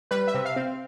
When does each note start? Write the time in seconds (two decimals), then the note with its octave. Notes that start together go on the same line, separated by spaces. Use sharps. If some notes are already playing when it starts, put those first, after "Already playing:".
0.11 G3 B4
0.28 E5
0.34 C3
0.45 F5
0.56 C4